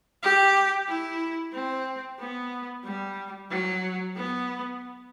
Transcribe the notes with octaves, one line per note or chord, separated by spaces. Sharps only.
G4
E4
C4
B3
G3
F#3
B3